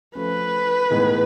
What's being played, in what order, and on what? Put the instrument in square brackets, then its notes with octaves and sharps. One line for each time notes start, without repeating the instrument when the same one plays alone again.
[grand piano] F3 A3 C#4 [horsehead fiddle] B4
[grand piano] A2 E3 G#3 B3 D#4